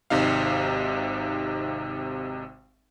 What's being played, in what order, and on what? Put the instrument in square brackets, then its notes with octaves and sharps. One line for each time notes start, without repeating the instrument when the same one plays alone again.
[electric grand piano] G#1 C3 D#4 F5